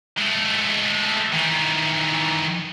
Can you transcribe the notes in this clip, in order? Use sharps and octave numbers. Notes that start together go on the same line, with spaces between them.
G#3 A3
D#3 E3